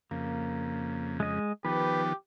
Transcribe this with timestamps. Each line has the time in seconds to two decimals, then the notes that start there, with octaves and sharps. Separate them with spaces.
0.11 F2 C#3 A#3
1.20 G#3 D#5
1.65 D#3 F3 B3 G4 B4